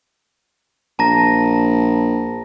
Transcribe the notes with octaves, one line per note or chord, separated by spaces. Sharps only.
A#1 A5 A#5 A#6